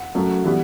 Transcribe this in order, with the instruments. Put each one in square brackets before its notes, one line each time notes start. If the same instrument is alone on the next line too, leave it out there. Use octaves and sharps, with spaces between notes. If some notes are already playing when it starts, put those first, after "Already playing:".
Already playing: [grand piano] F#5
F#2 F#3 A3
E3 G3 B3